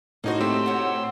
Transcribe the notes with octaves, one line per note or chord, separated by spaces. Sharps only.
A2 A#3 C#4 D#4 F#4 C5
A3 C4 G4 C6 E6
F#4 C#5